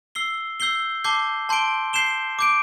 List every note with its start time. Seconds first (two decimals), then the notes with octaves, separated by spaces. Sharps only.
0.15 E6 C7 G7
0.60 E6 G6 C7 G7
1.04 A5 D6 G6 C7 G7
1.49 A5 C6 G6 D7 G7
1.93 G6 C7 E7 G7
2.39 D6 G6 D7